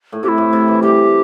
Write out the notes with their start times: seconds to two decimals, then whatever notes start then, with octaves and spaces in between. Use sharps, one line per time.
0.12 A2
0.23 C3 G4
0.28 E4
0.38 A2
0.53 C3
0.68 E3
0.82 G3 G4